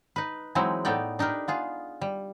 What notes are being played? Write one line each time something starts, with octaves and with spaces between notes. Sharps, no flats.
D#4 B4
E3 F#3 G#3 C4 D#4 E4
A2 A3 B3 D#4 D5 G5
D4 D#4 G4 A#4 B4
B3 F4 G#4
G3